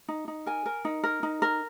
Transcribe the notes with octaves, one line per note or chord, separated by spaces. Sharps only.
D#4
D#4
A#4 G#5
A#4
D#4
A#4
D#4
A#4